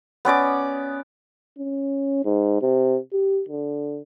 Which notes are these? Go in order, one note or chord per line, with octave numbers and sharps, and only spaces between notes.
B3 C#4 D5 D6
C#4
G#2
C3
G4
D3